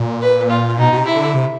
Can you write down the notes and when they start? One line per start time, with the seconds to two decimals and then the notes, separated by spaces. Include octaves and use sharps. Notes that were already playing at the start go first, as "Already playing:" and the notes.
Already playing: A#2
0.22 B4
0.50 F4
0.78 B2 D#4
0.93 B2
0.97 C3
1.06 E4
1.16 D3
1.34 C3